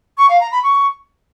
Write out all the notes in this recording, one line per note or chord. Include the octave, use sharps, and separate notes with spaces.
C#6
F5
A#5
B5
C#6